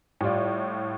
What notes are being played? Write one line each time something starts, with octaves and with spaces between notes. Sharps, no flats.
A2 G3 F4 D5